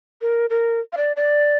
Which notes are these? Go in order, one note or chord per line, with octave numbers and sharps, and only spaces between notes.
A#4
A#4
F5
D5
D5